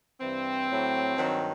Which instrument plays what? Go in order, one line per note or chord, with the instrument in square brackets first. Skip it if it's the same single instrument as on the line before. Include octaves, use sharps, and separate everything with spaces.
[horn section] G2 E3 C4
A2 F#3
G2 D#3 F#3